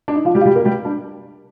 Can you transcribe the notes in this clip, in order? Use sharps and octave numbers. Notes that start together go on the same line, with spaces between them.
D4
D#4
F3 F4
G3 G4
F4
G3 G4
A#3 A#4
G3 G4
D4